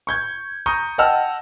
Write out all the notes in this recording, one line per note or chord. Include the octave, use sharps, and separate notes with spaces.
C#6 G6 G#6
A#5 C#6 D#6 G6
D#5 F#5 G5 A5 E6 F6